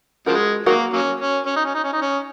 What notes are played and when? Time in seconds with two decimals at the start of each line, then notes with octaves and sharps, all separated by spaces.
0.26 C#3 F3 G#3 F#4 A#4
0.66 D#3 F#3 A#3 F#4 A#4
0.93 F#3 A#3 C#4
1.20 C#4
1.46 C#4
1.56 D#4
1.65 C#4
1.75 D#4
1.84 C#4
1.93 D#4
2.02 C#4